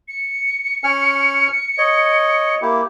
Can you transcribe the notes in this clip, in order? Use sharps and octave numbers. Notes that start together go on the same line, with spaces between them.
C#7
C#4 G#5 F6
C#5 D#5
A#3 E4 G4